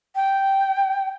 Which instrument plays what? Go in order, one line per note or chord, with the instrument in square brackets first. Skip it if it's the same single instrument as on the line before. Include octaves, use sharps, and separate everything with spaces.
[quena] G5